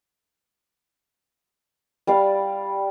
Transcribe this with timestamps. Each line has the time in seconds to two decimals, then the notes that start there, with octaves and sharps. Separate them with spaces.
2.07 G3 D5 F5